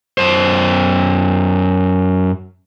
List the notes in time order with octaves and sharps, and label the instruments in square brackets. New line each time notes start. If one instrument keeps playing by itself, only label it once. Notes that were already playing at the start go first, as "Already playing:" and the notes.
[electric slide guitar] F#2 C5